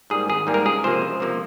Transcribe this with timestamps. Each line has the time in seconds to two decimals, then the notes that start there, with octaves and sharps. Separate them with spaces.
0.10 G#2 G3 A#3 G#4
0.28 G#1 G#4
0.47 G#2 G3 A#3
0.54 A#4
0.66 C#2 G#4
0.84 C3 F3 A#3 C5
1.02 C#2
1.20 C3 F3 A#3